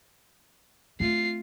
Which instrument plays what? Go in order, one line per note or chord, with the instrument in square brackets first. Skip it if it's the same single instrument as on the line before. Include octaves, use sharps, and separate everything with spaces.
[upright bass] A3 C4 [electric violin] F4 C7